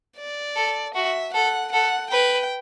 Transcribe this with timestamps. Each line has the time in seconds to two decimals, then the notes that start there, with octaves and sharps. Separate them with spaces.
0.17 D5
0.56 A4
0.95 F#4 E5
1.34 A4 F#5
1.73 A4 F#5
2.11 B4 G5